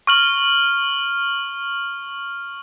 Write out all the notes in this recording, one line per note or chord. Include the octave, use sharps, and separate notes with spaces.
C#6 F6 F#7